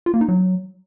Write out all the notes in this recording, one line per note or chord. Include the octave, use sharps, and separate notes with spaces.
F4
A#3
D#4
F#3